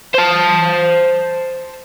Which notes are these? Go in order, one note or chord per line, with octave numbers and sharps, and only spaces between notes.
C5 A5